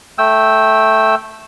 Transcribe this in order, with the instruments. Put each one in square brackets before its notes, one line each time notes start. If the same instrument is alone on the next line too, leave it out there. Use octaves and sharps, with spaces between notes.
[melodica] A3 G5 E6